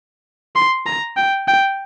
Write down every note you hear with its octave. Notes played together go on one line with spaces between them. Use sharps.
C6
A#5
G5
G5